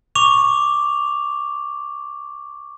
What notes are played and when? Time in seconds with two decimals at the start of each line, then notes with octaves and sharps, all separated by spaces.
0.15 C#6 D6 F7